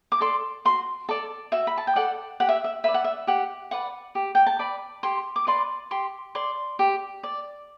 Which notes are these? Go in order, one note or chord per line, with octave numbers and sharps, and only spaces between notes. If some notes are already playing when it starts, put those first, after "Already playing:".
D6
A4 D5 C6
F#4 C6
A4 D5 A5
F#4 E5
B5
A5
G5
A4 D5 F#5
G4 F#5
E5
E5
B4 D5 E5
F#5
E5
G4 F#5
B4 D5 F#5
G4
G5
A5
B4 D5 B5
G4 C6
D6
B4 D5 C6
G4 C6
D5 C6
G4
D5